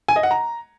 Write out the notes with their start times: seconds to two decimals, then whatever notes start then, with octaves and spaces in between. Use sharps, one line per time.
0.08 G#5
0.16 D#5
0.23 F#5
0.31 A#5